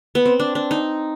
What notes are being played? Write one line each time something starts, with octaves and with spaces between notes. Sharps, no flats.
B3
C4
D4
D4
D#4